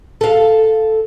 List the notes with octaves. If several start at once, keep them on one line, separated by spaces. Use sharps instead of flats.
A4 F5